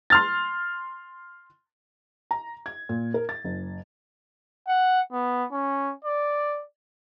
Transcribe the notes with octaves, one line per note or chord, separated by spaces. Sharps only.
C6 F6 A6
A#5
G#6
A#2
A#4
A6
F#1
F#5
B3
C#4
D5